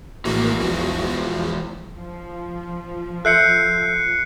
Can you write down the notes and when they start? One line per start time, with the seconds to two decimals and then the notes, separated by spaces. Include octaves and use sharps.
0.25 A#1 A2 E3 G#3 A#3 F#4
0.59 E2 F3
1.96 F3
3.25 A4 E5 F#6 G6 C7 C#7